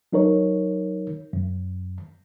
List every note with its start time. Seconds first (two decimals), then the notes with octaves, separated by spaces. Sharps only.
0.13 F#3 D#4 A#4 C#5
1.33 F#2